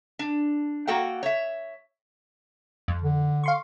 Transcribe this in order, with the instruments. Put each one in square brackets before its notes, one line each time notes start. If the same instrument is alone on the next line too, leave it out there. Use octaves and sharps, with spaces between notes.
[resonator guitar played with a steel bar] D4
A#3 F#4 A4 F#5 G5
C#5 E5
[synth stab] F2
[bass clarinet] D3
[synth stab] F5 C6 C#6